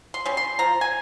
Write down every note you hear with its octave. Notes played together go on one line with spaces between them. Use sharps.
C6
G3 C#4
C6
F3 A#5
G#5